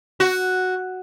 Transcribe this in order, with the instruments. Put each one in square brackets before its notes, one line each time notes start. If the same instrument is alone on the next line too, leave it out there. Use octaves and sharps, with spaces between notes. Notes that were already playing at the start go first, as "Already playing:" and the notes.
[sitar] F#4